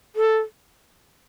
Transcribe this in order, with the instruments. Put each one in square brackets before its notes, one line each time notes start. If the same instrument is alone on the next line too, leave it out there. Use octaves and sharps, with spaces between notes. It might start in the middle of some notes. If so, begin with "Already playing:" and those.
[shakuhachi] A4